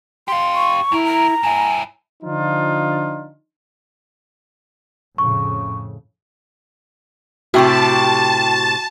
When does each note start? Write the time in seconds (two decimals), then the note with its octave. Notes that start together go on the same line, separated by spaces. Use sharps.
0.28 G4 F5 C6
0.55 C#6
0.92 E2 E4 A#4
1.06 A#5
1.43 G2 E4 G#5
2.23 D3 F3 D4 D#4 F4
5.18 F2 A2 C#3 C#6
7.54 A2 C3 F#4 G4 G5 A5 C#6